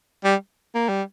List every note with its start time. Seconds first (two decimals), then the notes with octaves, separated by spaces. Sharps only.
0.24 G3
0.75 A#3
0.88 G3